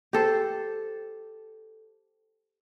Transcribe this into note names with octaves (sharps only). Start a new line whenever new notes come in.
G4 A4 C5